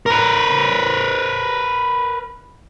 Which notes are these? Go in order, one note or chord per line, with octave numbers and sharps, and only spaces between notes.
A#4 B4